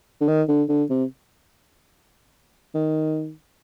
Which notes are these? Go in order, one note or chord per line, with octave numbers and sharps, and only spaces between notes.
D3
D#3
D3
D3
C3
D#3